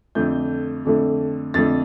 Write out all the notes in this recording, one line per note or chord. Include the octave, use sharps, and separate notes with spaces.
F2 D3 A3 G6
F2 D3 A3
F2 D3 A3 A6